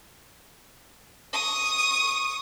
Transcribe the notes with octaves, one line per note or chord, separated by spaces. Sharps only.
C#6 D#6